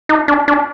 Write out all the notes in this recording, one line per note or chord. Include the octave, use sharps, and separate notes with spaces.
D#4
D4
D4